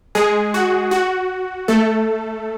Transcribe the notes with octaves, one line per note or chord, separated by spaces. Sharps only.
G#3 G#4
F#4
F#4
A3 A4